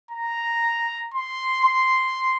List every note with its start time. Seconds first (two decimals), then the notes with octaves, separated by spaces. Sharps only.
0.11 A#5
1.14 C6
1.65 C6